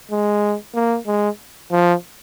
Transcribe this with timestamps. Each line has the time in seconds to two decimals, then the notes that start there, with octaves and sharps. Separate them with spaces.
0.11 G#3
0.75 A#3
1.07 G#3
1.71 F3